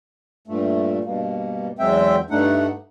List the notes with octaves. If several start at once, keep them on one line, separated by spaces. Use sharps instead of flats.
G2 A#2 A3
G2 B2 A#3
E2 F#3 G#3 C4 E5 G5
G2 A3 D4 D#4 F#5